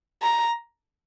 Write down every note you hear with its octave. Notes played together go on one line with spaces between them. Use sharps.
A#5